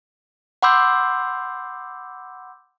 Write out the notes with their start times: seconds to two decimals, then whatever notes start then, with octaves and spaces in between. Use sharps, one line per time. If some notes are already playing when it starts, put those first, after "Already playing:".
0.63 F#5 B5 C6 D6 E6 G6